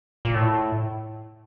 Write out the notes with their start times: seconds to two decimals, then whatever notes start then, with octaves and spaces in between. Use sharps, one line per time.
0.25 A#2
0.34 A2